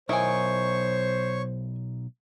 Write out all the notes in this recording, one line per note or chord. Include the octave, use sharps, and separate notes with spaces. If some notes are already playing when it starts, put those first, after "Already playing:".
B1 E4 A#4 C5 C#5 D#5 G#5 C#6